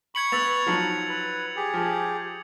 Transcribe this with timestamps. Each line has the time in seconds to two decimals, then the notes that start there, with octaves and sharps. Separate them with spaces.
0.15 B5 C#6 G#6 C#7 F#7
0.32 B3 E6 A6 F7
0.66 F3 F#3 D#4
1.09 B4
1.56 G4 G#4
1.74 F3